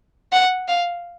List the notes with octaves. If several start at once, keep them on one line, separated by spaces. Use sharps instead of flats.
F#5
F5